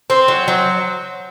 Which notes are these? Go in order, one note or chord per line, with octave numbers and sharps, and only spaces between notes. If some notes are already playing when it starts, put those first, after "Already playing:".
C4
F#3
F#3